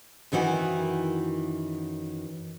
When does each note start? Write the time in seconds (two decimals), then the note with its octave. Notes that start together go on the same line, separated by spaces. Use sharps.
0.32 F#2 D#3 E3 E4 F#4